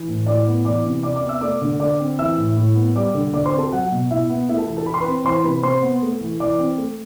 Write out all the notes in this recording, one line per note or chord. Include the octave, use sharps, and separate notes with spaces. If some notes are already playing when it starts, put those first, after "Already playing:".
Already playing: E3
A2
A2 D5 D6
B3
E3 D5 D6
C3
C3 D5 D6
D5 D6
B3
E5 E6
A3 D5 D6
D3
D3 D5 D6
C4
E3 E5 E6
A2
A2
B3
G3 D5 D6
D3
D3 D5 D6
C5 C6
C4
A4 A5
F#3 F#4 F#5
B2
B2 E4 E5
B3
A3 E4 E5
A4 A5
E3
A4 A5
E3 B5
C6
B4 B5
C4
E3 C5 C6
C3 B4 B5
C3 C5 C6
B3
A3
E3
E3 D5 D6
C4
A3